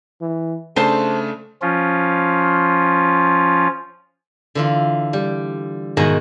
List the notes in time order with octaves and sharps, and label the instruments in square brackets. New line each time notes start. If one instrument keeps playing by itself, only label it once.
[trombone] E3
[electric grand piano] C#3 A3 D4 [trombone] A4 [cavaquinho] C5 A5 C6
[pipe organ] F3 C#4 F4
[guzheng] D3 E3 F4
G3
G#2 B2 D#3 G#5 A#5